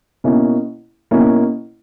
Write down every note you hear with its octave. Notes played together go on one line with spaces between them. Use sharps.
B2 A#3 C#4 E4
B2 A#3 C#4 E4